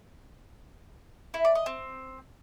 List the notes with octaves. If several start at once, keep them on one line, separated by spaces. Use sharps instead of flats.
E4
D5
D#5
C4